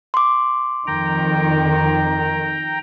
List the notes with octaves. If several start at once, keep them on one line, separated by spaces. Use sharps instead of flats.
C6 D6
F2 D#3 G5 A#5